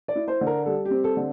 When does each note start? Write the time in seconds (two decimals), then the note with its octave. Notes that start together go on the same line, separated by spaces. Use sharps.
0.08 D5
0.16 E4
0.28 C5
0.41 D3
0.47 A#4
0.66 G3 A4
0.85 G4
0.91 C4
1.04 A4
1.17 D3